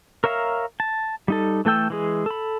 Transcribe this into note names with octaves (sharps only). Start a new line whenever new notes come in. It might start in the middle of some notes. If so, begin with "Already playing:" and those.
A#4 C#5 E5 F5 A#5
A5
G3 D#4 A4
E3 A3 A4 G5 E6
E3 G#3 G#4
A4 B5